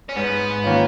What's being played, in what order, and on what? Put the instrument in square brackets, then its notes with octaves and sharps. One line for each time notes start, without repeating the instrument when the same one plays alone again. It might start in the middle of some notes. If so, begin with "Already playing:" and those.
[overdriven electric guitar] C#4
[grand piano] G#2 [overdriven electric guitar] B3
[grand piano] D#3 A#3 C#4 F4